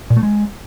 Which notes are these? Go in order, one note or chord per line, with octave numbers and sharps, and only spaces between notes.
A#2
A3
G#3